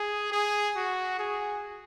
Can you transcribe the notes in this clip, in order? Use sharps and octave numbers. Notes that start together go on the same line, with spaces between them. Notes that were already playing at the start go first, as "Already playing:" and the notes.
Already playing: G#4
G#4
F#4
G#4